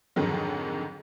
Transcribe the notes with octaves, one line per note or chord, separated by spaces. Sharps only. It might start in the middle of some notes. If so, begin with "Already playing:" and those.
F2 G#2 D3 D#3 F#3